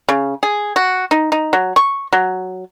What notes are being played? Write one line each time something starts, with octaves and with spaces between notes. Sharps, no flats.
C#3
G#4
F#4
D#4
D#4
F#3
C#6
F#3